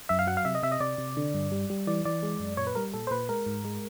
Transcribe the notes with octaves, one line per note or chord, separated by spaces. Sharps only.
F#2 E5
F5
F#3 F#5
F5
C3 E5
D#5
C3 E5
D#5
C3 D5
C3
D3
G2
G3
G3
E3 D5
E3 D5
G#3
F#2
A#2 C#5
B4
G3 A#4
A#2 A4
C5
A#2 B4
G#3 A#4
G#2
G#3